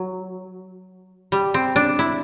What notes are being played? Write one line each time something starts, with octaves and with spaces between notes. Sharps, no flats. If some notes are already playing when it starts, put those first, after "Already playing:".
Already playing: F#3
G3
C4
D4
E4